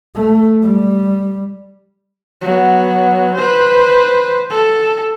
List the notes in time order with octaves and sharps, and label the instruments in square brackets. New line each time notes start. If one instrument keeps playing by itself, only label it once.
[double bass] A3
G3
[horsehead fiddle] F#3 B3
B4 C5
A4